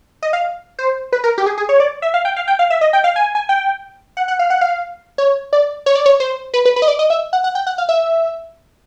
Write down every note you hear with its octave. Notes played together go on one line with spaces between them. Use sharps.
D#5
F5
C5
B4
A#4
G4
G#4
G#4
C#5
D5
E5
F5
G5
F5
G5
F5
E5
D#5
G5
F5
G#5
G#5
G5
F#5
F#5
F5
F#5
F5
C#5
D5
C#5
D5
C#5
C5
B4
B4
B4
D#5
D5
D#5
E5
F#5
F#5
G5
F#5
F5
E5